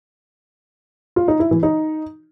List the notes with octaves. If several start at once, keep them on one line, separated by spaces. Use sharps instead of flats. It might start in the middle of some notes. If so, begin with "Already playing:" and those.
F4
D#4
E4
E3
D#4